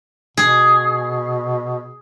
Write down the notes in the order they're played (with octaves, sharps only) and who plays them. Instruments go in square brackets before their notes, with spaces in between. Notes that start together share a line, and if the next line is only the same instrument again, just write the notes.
[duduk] B2 [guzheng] G#4